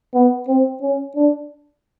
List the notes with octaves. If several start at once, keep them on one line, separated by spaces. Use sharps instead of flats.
B3
C4
C#4
D4